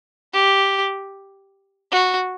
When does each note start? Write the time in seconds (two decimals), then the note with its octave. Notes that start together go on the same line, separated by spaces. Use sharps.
0.34 G4
1.92 F#4